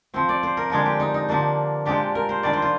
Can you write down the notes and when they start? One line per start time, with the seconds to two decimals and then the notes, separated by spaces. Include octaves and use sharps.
0.14 F3 C4 C5
0.29 D5
0.43 C5
0.57 A#4
0.70 D3 F3 G#3 D4 G#4
0.86 G4
1.00 D#4
1.14 D#4
1.28 D3 F3 A#3 D4
1.85 A#2 F3 G#3 D4 G4
2.15 A#4
2.29 C5
2.43 D#3 G3 D4 D5
2.53 C5
2.62 F4